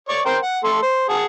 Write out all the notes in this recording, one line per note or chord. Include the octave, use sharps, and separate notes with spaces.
C#5 D5 C#6
A#4 C5 G5
F#5
A3 A4 C6
C5
G#4 F#5 A5